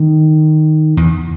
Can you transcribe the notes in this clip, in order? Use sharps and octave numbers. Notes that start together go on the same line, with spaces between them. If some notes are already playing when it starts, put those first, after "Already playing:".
Already playing: D#3
E2